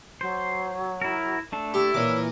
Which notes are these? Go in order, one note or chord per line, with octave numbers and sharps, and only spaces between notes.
F#3 C5
E4 A#4
A3 D4 A4
E4 G4
A#2 E3 A#4 C#5 D6